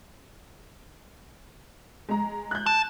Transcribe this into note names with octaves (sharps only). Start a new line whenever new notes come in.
G#3 A#5
F#6 G6
A5